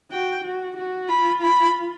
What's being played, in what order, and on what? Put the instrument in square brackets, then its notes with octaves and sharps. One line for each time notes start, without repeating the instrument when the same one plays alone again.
[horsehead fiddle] F#4 [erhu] G5
[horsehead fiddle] F#4
F#4
[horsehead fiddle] F4 [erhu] B5
[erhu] B5